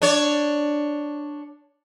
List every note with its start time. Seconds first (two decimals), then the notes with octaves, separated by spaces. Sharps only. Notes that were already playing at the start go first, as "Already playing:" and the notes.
0.02 D4 C#5